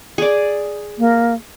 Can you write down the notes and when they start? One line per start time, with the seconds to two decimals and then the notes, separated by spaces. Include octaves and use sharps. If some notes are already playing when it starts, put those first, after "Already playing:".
0.18 G#4 D5
0.99 A#3